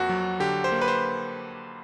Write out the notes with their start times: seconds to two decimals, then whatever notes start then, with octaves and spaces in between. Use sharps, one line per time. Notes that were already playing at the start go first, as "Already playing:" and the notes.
Already playing: F2 A#3 F#4
0.09 F#3
0.40 D3 G4
0.64 C5
0.72 A#3
0.81 B4
0.88 C5